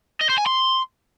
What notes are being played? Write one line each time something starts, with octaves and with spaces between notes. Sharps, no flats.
D#5
C5
G#5
C6